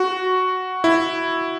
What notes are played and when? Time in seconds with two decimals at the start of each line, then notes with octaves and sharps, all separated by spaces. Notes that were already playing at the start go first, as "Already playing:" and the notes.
Already playing: F#4
0.84 E4